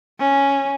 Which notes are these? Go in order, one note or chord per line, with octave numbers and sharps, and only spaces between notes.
C#4